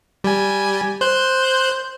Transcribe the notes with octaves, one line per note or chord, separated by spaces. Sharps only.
G3 G#5
C5 F#6 G6